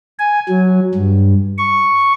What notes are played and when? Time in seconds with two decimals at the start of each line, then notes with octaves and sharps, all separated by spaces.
0.19 G#5
0.49 F#3
0.95 G2
1.58 C#6